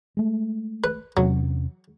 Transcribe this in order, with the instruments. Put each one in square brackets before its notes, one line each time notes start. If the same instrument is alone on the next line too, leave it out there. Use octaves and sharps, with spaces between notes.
[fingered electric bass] G#3 A3
[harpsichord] B4
[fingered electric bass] E2 C3 C#4 [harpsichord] F#3